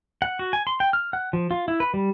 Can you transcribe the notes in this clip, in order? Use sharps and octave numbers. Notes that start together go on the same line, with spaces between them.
F#5
F#4
G#5
C6
G5
F6
F#5
F3
F4
E4
B4
G3